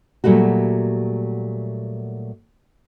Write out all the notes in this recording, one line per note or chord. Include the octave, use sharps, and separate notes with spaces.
A#2 F#3 G3 A3 F#4